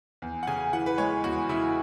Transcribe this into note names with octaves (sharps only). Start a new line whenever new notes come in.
E2
F#5
C#3 G#5
E3 F#5
B4
G#3 C#5
E2 F#4
C#3 E4